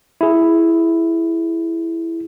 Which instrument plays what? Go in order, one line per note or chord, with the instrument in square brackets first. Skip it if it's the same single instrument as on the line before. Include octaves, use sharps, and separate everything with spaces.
[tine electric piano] E4 G#4